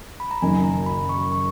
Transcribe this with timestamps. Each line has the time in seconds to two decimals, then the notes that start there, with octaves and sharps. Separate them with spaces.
0.20 B5
0.31 A#5
0.42 F#1 F#2 D#3 G#5
0.64 A#5
0.86 B5
1.09 C#6
1.32 C#6